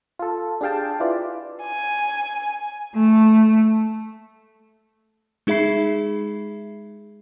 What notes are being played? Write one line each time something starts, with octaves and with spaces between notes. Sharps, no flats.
F4 A4
D4 G4 G#4 F5 G5 A5
E4 F4 B4 D5
G#5
A3
G#3 D#4 G#4 E5 B5 C7